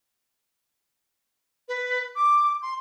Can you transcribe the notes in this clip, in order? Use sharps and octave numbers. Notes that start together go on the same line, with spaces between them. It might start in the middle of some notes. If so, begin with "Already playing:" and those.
B4
D6
C6